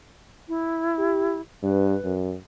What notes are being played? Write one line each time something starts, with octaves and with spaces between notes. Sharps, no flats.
E4
G4
G2 B4
F#2